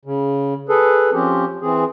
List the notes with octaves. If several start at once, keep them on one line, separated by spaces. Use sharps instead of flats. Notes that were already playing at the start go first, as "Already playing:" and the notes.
C#3
G#4 A4 B4
F3 C4 C#4 G4
E3 C4 G#4